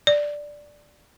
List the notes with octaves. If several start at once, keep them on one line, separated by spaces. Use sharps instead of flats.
D5